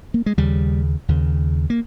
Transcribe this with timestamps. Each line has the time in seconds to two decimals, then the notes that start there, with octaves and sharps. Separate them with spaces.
0.14 A#3
0.26 G#3
0.37 D#2 C#3 G3
1.08 D#2 C#3
1.70 A#3